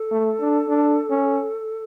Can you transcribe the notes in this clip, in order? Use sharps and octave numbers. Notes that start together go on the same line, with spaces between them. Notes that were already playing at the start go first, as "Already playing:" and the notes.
Already playing: A4
A3
D4
D4
C#4